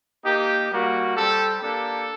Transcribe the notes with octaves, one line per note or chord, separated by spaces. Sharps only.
A#3 D#4 G4
G3 A#3 F#4
G3 C4 G4 A4
A#3 D4 G4 A4